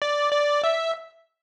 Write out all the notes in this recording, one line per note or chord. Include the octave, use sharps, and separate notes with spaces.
D5
D5
E5